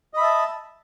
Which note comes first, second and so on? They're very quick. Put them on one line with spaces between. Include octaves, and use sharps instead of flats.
D#5 B5 E5 A5